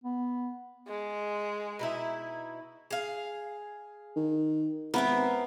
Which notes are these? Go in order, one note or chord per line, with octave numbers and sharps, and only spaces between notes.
B3
G#3
B2 D#4 E4
G#4 F5
D#3
G#1 B3 C4 E4 A#4